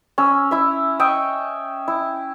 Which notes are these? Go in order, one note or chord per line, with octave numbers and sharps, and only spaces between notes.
C#4 E6
E4 E5
D#5 E5 G5 C#6
E4